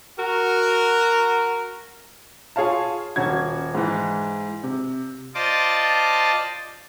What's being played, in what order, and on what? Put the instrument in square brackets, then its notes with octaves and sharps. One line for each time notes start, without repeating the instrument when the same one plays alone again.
[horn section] F#4 A#4
[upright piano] F4 G#4 C#5 F5 A5
D#1 C#4 F#4 G#6
G#2 E3
C3
[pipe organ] F4 C5 D5 D#5 A5 D6